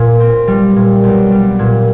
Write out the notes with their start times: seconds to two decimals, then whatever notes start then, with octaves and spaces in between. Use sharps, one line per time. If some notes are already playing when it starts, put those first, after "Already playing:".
Already playing: A#2
0.20 C4
0.48 G3
0.76 A#2
1.03 B1
1.31 G3
1.59 A#2